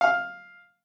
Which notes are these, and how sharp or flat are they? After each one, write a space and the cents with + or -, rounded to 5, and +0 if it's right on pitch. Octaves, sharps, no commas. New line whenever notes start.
F5 +5